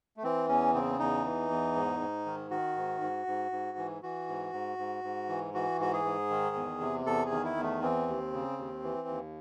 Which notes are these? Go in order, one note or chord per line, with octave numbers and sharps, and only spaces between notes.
A3
E3 C4
E2 C#4
C#3 C4
E2 D#4
E3
E2
G#2
G#2
D#3
D#3 F#4
G#2
G#2
G#2
G#2
E3
E3 F#4
G#2
G#2
G#2
G#2
E3
E3 F#4
G#2 F#4
G#4
G#2
D#3
E2
C3
E2 A4
G#4
D#3
E4
E2
A3
E3 C4
D#2
C#3
D#2
E3
D#2